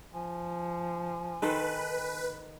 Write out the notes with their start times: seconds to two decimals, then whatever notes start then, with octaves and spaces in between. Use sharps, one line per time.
0.13 F3 G#5
1.42 D#3 A4 B4 C5